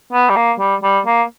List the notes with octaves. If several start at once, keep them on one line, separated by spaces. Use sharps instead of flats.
B3
G3
A#3
G3
G3
A#3